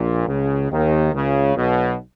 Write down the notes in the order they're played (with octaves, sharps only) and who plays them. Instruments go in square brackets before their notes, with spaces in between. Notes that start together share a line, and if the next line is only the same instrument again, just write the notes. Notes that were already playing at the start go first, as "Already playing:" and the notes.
Already playing: [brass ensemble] A#1 A#2
C#2 C#3
D#2 D#3
C#2 C#3
B1 B2